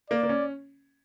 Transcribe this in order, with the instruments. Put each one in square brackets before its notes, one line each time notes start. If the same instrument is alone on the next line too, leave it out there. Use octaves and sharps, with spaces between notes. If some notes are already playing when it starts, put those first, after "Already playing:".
[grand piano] A#3 [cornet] D5
[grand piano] A#3
C#4